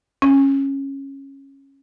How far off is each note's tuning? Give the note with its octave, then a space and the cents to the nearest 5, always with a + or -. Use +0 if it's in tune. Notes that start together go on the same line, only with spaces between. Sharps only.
C#4 -15